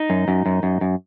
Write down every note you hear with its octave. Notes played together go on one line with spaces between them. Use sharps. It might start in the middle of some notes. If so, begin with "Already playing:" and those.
Already playing: D#4
F#2
F#2
F#2
F#2
F#2